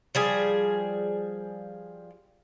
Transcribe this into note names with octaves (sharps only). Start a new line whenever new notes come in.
F3 G3 G#4